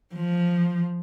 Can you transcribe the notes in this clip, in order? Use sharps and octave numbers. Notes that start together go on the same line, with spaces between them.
F3